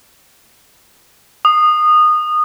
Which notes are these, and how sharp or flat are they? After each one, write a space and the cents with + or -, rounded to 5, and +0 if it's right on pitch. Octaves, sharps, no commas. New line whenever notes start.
D#6 -20